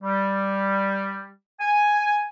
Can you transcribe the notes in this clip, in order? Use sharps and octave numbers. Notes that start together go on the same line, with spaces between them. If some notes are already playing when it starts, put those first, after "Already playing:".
G3
G#5